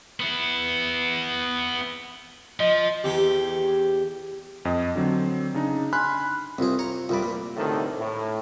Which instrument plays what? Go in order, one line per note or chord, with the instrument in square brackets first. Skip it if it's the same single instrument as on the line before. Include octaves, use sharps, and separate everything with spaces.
[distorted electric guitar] B3 E4
[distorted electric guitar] F3 [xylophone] D#5
[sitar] E2 G4
[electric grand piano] F2 D#5
D3 F#3 C4
C#3 D4 D#4
G#5 B5 C6 F6 F#6
[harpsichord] C2 G#4 [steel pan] C4 F4 C5
[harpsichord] C#5 A#5
[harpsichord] C2 G2 D5 [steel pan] F4 B5
[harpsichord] A#2
[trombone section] D2 A2 C3 D#3 A4
A2